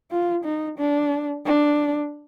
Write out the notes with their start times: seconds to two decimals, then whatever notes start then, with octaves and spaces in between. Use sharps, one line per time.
0.11 F4
0.45 D#4
0.78 D4
1.46 D4